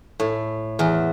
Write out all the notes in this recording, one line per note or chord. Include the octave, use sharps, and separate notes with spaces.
A2
E2